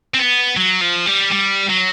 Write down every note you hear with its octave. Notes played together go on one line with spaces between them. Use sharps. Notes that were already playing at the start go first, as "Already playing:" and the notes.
C4
B3
F#3
F3
G3
G3
F#3